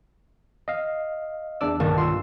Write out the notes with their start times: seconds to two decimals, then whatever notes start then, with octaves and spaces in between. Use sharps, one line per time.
0.68 D#5 F5
1.61 E2 D4 D5 E6
1.80 B1 G2 D#3 A#3 A5
1.98 F4 C6 E6